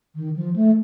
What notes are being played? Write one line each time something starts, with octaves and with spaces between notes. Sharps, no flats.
D#3
F3
A3